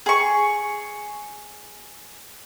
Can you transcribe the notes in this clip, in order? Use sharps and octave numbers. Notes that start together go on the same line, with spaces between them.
G#4 C#6